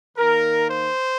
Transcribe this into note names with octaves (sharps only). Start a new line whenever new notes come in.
D#3 A#3 D#4 A#4
C5